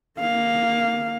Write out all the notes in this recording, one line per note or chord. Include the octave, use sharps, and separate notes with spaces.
A#3 F5